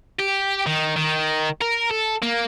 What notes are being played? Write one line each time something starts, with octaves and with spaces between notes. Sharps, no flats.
G4
D#3
D#3
A#4
A4
A#3